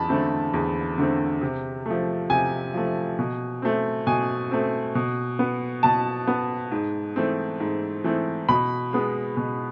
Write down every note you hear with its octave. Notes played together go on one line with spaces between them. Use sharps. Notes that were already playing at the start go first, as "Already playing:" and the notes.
Already playing: E2 A5 B5
D3 A3 C4
E2
D3 A3 C4
C3
F3 A3
C3 G#5
F3 A3
B2
A3 C4
B2 G#5
A3 C4
B2
B3
B2 A5
B3
G#2
E3 A3 C4
G#2
E3 A3 C4
B2 B5
G#3 B3
B2